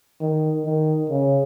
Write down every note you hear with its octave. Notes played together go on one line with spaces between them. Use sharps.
D#3
D#3
C#3